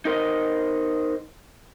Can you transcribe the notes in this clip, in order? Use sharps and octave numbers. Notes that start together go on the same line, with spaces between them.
D#4 A#4 C5 D#5